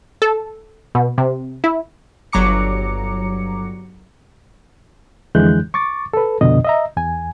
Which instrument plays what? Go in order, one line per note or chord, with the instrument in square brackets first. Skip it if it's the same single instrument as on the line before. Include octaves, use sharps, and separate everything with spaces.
[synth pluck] A4
B2
C3
E4
[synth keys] G1 F#3 A#5 D6 C#7
[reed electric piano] F2 D3 E3 G#3 F#6 G6
C#6 D6 A6
A4 B4
C2 F2 B2 D3 D#5
D#5 E5 A#5
E2 G#5